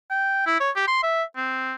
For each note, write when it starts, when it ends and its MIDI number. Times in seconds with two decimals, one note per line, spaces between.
0.10 0.44 79
0.46 0.59 64
0.60 0.70 73
0.76 0.86 67
0.88 1.02 84
1.03 1.23 76
1.36 1.74 60